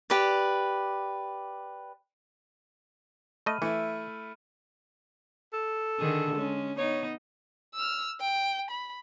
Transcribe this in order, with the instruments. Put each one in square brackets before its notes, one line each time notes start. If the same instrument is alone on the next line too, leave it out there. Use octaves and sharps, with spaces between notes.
[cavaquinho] G4 B4 D5
[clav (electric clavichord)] A3 D#5 [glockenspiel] B5 F6 D#7
[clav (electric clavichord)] E3 [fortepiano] A3 E4
[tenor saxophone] A4
[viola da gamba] D3 D#3 G#4
G#3 C#4
[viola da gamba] B3 D#4 [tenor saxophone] C#5
[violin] E6 F6
G5
B5